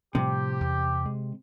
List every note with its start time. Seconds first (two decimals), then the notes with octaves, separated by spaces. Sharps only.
0.15 A2 C3 F3 G3 G4
0.61 E2
1.06 G#3